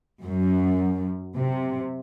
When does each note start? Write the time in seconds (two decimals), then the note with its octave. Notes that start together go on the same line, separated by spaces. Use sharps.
0.23 F#2
1.38 C3